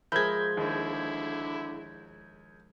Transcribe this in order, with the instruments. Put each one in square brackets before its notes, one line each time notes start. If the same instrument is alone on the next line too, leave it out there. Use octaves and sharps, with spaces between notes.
[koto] F3 G#3 [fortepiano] A#4 E5 B5 [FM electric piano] G6 G#6
[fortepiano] D#2 [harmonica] D3 E4